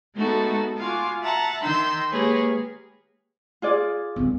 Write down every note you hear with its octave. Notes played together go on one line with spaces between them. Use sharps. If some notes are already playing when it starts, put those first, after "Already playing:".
G#3 A3 B3 D#4 F#4 A4
F4 F#4 G#5 D6
E5 F#5 A5 A#5
D#3 C6 E6 G6
G#3 A#3 G4 G#4 B4 C#5
F4 G#4 D5
G2 C4